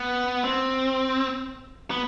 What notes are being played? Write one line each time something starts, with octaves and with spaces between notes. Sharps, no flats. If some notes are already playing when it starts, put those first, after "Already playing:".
Already playing: B3
C4
B3